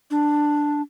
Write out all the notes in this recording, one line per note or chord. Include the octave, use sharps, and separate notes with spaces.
D4